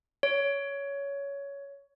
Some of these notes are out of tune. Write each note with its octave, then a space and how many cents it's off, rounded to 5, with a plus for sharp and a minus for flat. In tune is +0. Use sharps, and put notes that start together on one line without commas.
C#5 +15